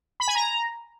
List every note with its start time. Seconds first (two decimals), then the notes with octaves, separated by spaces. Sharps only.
0.20 B5
0.28 G#5
0.35 A#5